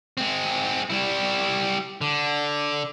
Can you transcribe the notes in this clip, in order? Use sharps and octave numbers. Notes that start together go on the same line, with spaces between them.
G#3 C4
G3 E4
D3